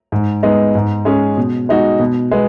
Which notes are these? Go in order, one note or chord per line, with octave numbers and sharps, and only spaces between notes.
G#2
G#3 B3 D#4
G#2
G#3 C#4 G#4
B2
G#3 D#4 F#4
B2
G#3 B3